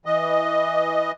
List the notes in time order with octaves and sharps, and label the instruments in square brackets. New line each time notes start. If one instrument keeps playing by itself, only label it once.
[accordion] E3 D#5